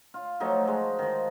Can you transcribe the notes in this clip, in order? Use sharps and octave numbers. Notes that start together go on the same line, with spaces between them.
F4
F3 F#3 A3 D#4
G#3
D#3 F3